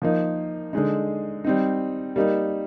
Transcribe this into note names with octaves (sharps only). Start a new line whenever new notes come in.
F3 A#3 D#4
D3 G#3 D#4
G3 C4 D#4
G3 A#3 D#4